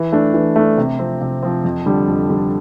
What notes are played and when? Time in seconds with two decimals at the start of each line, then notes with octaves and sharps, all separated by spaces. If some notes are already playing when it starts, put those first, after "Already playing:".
Already playing: E3
0.12 A3 D4
0.34 E3
0.56 A3 D4
0.78 C3
0.99 F3 C4
1.21 C3
1.43 F3 C4
1.64 F2
1.86 D3 G3
2.08 F2
2.29 D3 G3